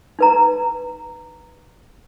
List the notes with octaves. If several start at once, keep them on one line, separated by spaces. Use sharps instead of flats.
D#4 B4 A#5